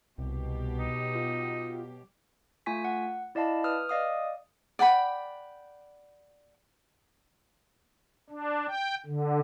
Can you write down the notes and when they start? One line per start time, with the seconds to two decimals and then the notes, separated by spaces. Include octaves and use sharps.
0.18 C2 B2 F#3 G4
0.79 D#4
1.15 F4
2.66 A3 F4 G#5 C#6 B6
2.85 F#5
3.35 E4 D5 D#5 F5 A5 B5
3.64 B4 D#6 F6
3.89 D5 D#5 F5 D#6
4.79 D5 F#5 G5 B5
8.30 D4
8.67 G5
9.06 D3